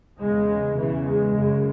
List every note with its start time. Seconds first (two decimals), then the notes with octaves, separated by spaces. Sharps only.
0.18 E2 C#3 G#3
0.77 E2 C#3 E3
1.06 G#3
1.36 F#2 C#3